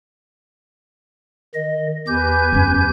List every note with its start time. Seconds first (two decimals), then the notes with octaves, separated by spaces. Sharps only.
1.55 D#3 D#5
2.07 E2 G4 B4 G#5 G6
2.52 F#2 C#4